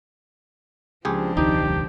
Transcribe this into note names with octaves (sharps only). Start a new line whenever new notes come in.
C#2 F3 C4 D4 G4 G#4
E1 C#2 D#3 D#4 G4